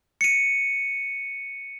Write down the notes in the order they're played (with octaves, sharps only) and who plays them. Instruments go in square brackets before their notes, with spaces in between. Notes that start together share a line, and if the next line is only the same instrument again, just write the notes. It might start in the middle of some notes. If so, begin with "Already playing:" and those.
[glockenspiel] C#7 D#7